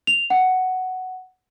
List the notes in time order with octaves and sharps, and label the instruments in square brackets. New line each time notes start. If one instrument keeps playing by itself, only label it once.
[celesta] F7
F#5